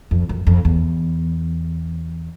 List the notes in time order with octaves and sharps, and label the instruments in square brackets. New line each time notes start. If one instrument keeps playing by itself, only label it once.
[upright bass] F2
F#2
F2
E2